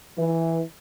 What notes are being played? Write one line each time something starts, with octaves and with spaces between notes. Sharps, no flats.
E3